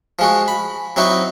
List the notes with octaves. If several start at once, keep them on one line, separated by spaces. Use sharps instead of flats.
F3 G#3 F#4
B5
F#3 C4 D#4 E4 F#4